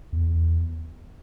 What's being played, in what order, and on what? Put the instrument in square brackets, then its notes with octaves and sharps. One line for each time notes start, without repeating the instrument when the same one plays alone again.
[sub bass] E2